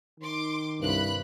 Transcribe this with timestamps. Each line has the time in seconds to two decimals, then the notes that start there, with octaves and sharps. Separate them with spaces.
0.20 D#3 C6 D6
0.81 C2 G2 B5 F#6